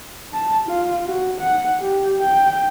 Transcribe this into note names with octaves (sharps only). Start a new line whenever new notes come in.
A5
F4
F#4
F#5
G4
G5